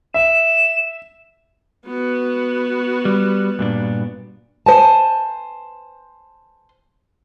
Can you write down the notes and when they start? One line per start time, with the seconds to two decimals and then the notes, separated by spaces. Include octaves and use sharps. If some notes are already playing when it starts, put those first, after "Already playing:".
0.14 E5 E7
1.87 B3 F#4
3.05 G3
3.59 G2 A#2 D4
4.66 C5 G#5 A5